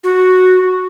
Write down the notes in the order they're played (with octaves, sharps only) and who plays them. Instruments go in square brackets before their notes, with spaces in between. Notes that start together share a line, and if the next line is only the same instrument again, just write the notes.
[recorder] F#4